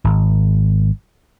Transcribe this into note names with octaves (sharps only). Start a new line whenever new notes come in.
G#1